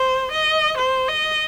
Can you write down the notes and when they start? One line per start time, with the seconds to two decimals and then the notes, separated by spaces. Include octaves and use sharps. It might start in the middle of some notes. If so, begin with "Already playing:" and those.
Already playing: C5
0.32 D#5
0.78 C5
1.08 D#5